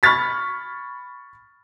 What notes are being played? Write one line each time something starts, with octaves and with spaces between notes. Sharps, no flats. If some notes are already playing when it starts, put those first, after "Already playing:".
B5 C#6 F6 G#6 A6 B6